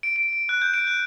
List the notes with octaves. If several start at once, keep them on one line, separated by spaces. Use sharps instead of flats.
D7
D7
D7
F#6
G6
D7
F#6